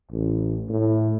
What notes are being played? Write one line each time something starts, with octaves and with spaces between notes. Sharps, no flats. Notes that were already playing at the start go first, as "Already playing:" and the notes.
A1
A2